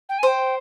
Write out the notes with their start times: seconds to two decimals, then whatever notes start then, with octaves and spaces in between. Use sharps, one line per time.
0.09 G5
0.18 G#5
0.23 C5 G5